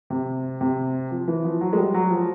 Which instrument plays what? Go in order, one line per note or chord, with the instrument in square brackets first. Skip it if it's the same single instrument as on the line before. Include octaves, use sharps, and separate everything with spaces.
[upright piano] C3
C3
F3
E3
F3
F#3
G#3
G3
F#3
F3